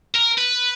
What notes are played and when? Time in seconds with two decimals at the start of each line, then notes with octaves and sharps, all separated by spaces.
0.16 A#4
0.38 B4